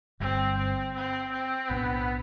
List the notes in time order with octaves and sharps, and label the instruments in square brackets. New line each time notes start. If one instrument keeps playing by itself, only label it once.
[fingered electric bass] G1 G2 D3 G3 [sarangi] C4
[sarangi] C4
C4
C4
[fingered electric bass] B1 A2 G3 D4 [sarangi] B3